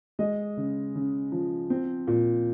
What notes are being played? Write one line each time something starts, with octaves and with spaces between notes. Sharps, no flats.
G#3 D#5
C#3
C#3
F3
C4
A#2